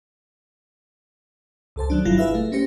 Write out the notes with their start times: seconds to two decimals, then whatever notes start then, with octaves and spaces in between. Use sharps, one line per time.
1.76 C#2 A4 C5 A5
1.90 D#3 F#3 D4
2.05 G1 B2 F#3 E4 F4 A#6
2.18 E4 G#4 B4 E5 F5
2.35 A3
2.52 A#3 C#4 G4 C5 A#6 C#7